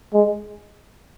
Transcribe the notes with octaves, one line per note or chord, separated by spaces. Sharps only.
G#3